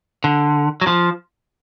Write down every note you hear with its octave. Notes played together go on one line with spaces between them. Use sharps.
D3
F#3
F3